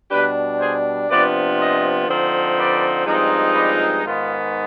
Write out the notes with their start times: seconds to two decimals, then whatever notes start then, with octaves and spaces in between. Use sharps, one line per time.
0.11 B2 G3 D4 G4 B4
0.60 G#4 C5
1.10 C3 F3 B3 D4 B4 D5
1.59 C5 D#5
2.08 D3 F3 C4 D#4
2.57 B4 D5
3.06 G2 F3 G#3 C4 D#4
3.56 B4 D5
4.05 G#2 D#3 B3 F4